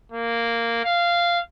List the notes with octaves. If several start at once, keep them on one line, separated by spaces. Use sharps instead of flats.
A#3
F5